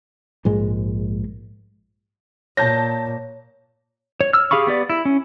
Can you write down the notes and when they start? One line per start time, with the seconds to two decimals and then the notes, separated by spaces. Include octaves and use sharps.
0.45 A#1 G#2 G#3
2.57 A#2 C#5 A5 G6 A#6
4.21 C#5
4.33 E6 F6
4.51 G4 G#4 F5 B5 C#6
4.67 B3 G4 D5
4.90 E4
5.05 C#4